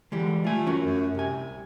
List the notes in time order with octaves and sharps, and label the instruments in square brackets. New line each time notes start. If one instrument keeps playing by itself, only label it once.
[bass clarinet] D3 [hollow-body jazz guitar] E3 G3 G#3
[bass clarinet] A3 [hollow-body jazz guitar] F4 G#5
[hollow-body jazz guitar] C#4 F#4 A#4
[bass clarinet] F#2
[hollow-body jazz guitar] C2 G#5 [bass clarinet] C3